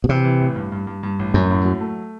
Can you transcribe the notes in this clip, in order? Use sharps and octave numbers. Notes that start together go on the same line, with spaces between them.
B2
C3 E3
E3
A1
G2
G2
G2
G2
A1
F#2 F#3
A2
F#3
A3